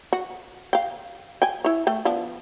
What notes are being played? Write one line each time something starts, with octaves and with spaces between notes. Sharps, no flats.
F#4
F5 G5
G5 G#5
E4 C#5
A3 G5
F3 B3 D4